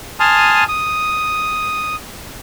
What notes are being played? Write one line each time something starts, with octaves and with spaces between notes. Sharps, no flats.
G#5 A5 C6 D#6 F6
D#6